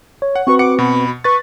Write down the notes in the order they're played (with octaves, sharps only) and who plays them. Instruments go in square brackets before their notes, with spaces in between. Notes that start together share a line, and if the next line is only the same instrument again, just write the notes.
[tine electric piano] C#5
[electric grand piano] F#5
[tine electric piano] C4 F#4 B4 [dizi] C#6
[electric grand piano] F#5 C#7 [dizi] D6
[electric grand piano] B2 [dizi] B5
[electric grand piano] B4 A6 [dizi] C#6